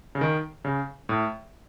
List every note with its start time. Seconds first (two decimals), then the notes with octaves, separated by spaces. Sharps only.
0.15 C#3
0.21 D#3
0.65 C#3
1.09 A2